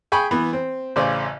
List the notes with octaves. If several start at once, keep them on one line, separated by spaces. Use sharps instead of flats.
G#4 G5 G#5 B5 C#6
E3 B3
C4
A1 C#3 C5 D5 G#5